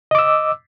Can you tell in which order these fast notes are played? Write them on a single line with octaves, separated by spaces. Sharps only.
D#5 D6 E6